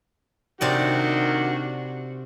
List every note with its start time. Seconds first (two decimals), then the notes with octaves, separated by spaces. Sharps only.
0.61 C3 D#3 D4 F#4 D5 G5